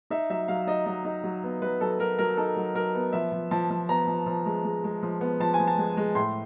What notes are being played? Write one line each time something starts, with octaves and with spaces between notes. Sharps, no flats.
D#4 E5
F#3 E5
F#3 F5
D#4 D#5
F#3 D#5
D#4
F#3
B3
F#3 B4
F#3 A4
F#3 A#4
F#3 A#4
D#4 A4
F#3
F#3 A#4
B3
F3 E5
F3
F3 A5
F3
B3 A#5
F3
F3
G#3
G#3
G#3
F3
B3
F3 A5
G#5
F3
A5
G#3
G#3
A2 C6